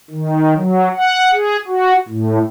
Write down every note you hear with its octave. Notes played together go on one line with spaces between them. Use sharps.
D#3
F#3
F#5
G#4
F#4
A2